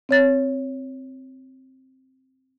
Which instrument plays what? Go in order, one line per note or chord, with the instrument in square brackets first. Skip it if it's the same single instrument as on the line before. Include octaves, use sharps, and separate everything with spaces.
[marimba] C4 C#5 A6